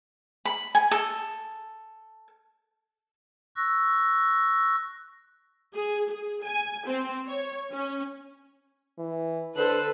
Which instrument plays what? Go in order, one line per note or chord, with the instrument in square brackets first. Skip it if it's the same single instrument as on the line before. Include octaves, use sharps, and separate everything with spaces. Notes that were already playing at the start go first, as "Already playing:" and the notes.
[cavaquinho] B5
G#5
A4
[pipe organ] C#6 E6 F#6 A#6
[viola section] G#4
G#4
G#5
C4
C#5
C#4
[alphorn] E3
[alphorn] D3 [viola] A4 [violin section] B4 [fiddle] C5 F#6